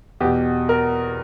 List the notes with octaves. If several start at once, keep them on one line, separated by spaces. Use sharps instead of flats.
E2 B2 G4
A#4